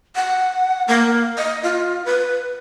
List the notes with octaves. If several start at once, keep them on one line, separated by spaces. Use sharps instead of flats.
F#5
A#3
D#5
F4
B4